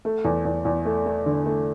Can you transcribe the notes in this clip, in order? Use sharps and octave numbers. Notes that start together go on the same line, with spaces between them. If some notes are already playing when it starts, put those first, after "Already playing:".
A3
E2
E2
E2
A3
A3
D3
A3